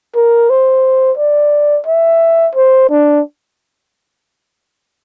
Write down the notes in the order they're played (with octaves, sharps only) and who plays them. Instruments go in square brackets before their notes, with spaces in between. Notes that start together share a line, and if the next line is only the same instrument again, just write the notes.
[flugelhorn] A#4
C5
D5
E5
C5
D4